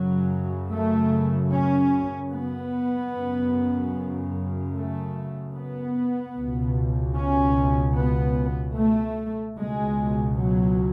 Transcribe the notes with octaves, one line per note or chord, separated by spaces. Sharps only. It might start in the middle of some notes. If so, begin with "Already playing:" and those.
Already playing: F#2 C#3 F#3
A3
C#4
B3
F#2 C#3
A3
B3
C#2 B2
C#4
B3
A3
C#2 B2 G#3
F#3